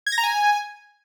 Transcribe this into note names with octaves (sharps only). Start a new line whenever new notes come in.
G#6
A#6
A#5
G#5